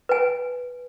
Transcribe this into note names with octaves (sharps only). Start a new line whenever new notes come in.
B4 G#5